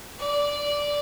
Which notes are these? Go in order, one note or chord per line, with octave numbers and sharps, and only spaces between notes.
D5